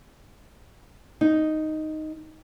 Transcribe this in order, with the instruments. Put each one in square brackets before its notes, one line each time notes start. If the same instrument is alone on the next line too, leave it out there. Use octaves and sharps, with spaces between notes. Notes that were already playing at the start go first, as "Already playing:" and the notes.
[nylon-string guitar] D#4